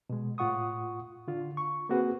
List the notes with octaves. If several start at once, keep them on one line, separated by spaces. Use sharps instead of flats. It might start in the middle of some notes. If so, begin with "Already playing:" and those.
B2 G#3
A2 F4 F#5 C#6 D#6
D3 F4
C#6
A#3 C4 F#4 G#4 B4